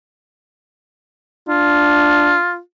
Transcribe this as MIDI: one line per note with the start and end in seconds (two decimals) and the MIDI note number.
1.49 2.38 62
1.49 2.59 65